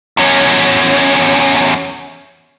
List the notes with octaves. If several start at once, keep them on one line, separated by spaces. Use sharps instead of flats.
E2 C#4